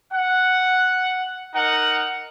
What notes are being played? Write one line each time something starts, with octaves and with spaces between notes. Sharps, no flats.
F#5
D#4 A#4 F#5